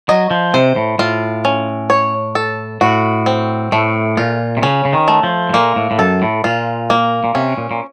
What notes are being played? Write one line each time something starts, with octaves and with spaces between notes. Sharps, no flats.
F#3 D#5
F3
C3 C5
A2
A2 F4
C#4
C#5
A4
A2 F#4
C4
A2 A3
A#2 F4
C3
C#3 C#4
C#3
D#3
A3
F3
A2
A#2 A#3
A2
A2
F#2 A4
A2
A#2 F4
A#3
A#2
C3 C#4
A#2
A#2